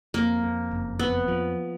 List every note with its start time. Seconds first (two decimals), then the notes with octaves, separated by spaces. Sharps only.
0.14 F2 A#3
0.43 F2
0.71 F#1
0.99 F2 B3
1.28 F3